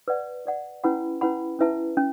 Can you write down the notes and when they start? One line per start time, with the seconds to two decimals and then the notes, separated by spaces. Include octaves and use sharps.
0.08 B4 D5 F#5
0.45 B4 D5 F#5
0.84 C#4 E4 B4 F#5 B5
1.21 C#4 E4 B4 F#5 B5
1.59 C#4 E4 B4 E5 A5
1.97 C#4